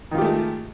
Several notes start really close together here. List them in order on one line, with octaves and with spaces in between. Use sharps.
D#3 F4 G4 A3 G#3